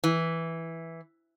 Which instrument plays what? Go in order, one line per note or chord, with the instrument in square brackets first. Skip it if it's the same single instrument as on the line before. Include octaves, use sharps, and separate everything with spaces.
[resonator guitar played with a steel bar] E3